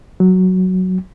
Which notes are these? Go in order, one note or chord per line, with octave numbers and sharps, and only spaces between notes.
F#3